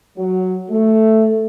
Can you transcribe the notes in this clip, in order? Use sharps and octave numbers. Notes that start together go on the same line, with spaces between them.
F#3
A3